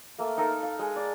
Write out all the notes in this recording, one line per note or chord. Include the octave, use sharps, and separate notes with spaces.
A3 A#3
D#4 A4 A#4 F5
F5
G#3
D5